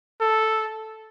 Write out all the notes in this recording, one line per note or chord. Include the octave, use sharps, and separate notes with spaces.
A4